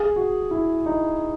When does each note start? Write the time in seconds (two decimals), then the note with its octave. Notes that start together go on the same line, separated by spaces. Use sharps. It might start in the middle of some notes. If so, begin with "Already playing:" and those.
Already playing: G#4
0.16 F#4
0.51 E4
0.86 D#4